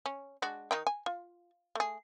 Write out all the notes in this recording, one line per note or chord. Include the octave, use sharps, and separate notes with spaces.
C#4
G#3 D4 F#4
D#3 D#4 G5
G#5
F4
A3 G#4